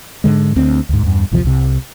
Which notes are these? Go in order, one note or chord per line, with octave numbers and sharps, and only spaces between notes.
G#2 D3 G#3
D2 C4
D2 G#2
E2 G2
A#1 E2 C3 F3
C2 C3